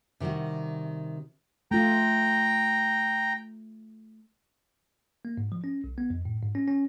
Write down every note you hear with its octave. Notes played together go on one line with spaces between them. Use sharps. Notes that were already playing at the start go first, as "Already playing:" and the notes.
C3 D#3 G3 E4 F#4
A3 F4 G5 A#5
A#3
G#2
F3
C#4
B1
B3
F2
A2
G#2
C#4
C#4